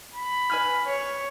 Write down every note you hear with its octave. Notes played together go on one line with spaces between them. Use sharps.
B5
B4 G#5 F6
C#5